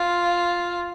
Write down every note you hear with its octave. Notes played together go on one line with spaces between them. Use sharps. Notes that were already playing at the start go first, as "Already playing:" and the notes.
Already playing: F4